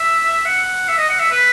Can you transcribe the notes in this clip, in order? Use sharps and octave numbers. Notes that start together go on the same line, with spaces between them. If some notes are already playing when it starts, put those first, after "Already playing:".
Already playing: E5
F#5
E5
D#5
F#5
E5
B4